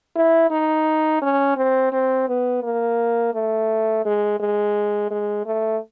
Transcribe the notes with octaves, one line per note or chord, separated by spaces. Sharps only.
E4
D#4
C#4
C4
C4
B3
A#3
A3
G#3
G#3
G#3
A3